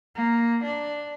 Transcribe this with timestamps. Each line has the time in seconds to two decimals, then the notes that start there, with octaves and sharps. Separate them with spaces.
0.15 A#3
0.64 D4